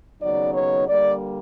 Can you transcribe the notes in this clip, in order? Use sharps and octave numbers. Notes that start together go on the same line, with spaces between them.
D#2 C#3 F#3 B3 D#4 D5
C#5
D3 G3 A#3 D5